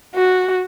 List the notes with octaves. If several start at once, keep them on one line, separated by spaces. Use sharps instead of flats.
F#4